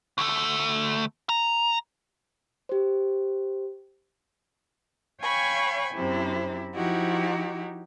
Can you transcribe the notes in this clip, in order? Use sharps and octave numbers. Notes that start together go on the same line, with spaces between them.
D2 A3
A#5
G4 C5
C#5 F5 G5 G#5 B5 C#6
F#2 C3 C4 E4
F3 D#4 E4 F#4 G4